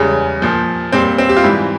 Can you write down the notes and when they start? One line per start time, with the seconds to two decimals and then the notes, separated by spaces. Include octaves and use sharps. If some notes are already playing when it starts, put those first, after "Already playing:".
Already playing: E2 C#3 G3 G#3
0.42 A#2 F3
0.92 A#2 G3 C4
1.18 C4
1.29 G4
1.37 F4
1.43 G#2 E3 G3 E4